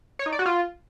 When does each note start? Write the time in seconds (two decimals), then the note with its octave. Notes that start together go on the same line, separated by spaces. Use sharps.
0.19 C#5
0.26 D#4
0.32 D5
0.39 F#4
0.46 F4